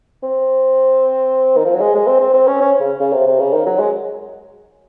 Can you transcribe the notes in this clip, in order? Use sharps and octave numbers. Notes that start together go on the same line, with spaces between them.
C4
D#3
F3
F#3
G#3
G#3
C4
C4
C4
C#4
C#4
C#3
C#3
C3
C3
C#3
D#3
F#3
G#3